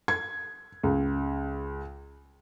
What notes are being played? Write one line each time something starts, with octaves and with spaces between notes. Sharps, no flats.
G#6
C#2